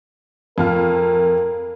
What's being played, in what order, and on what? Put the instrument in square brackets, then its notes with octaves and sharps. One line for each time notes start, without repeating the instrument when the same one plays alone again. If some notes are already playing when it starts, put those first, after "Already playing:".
[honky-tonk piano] F2 F5 F6 [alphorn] A#4